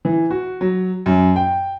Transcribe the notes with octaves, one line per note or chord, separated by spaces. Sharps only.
E3
F#4
F#3
F#2
G5